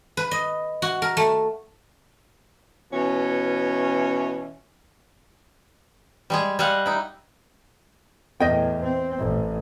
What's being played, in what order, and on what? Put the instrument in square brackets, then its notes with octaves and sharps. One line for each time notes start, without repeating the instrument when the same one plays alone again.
[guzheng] B4
D#5
F#4
A#4
A3
[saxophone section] B2 E3 C#4
[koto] G3 G#3 G#4
G3 D#5 F5 F#5
D#4 E4
[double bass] E2 A2 [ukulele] D#5 G5
[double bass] C4
A1